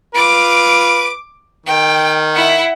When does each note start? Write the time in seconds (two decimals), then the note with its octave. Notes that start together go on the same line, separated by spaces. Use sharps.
0.15 F4 B4 D6 D7
1.66 D#3 G5
2.34 E4 F#5